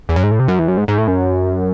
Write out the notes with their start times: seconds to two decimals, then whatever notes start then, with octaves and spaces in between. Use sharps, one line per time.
0.09 E2
0.16 F#2
0.23 G#2
0.31 A2
0.39 C3
0.48 F#2
0.59 E2
0.68 F#2
0.77 G#2
0.88 G#2
0.98 A2
1.08 F#2